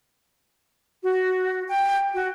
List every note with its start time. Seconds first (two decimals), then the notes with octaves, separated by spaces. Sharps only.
1.02 F#4
1.68 G5
2.16 F#4